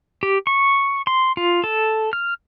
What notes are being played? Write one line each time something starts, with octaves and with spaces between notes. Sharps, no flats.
G4
C#6
C6
F4
A4
F6